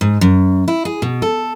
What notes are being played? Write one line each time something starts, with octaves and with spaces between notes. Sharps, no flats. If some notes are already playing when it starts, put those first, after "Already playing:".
G#2
F#2
E4
G#4
B2
A4